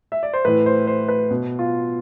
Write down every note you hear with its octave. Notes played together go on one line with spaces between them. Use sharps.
E5
D5
C5
A2 E3 B4
C5
C5
B4
B2
F4